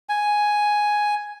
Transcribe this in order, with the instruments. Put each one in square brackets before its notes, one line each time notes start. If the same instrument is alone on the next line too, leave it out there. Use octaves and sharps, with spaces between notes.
[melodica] G#5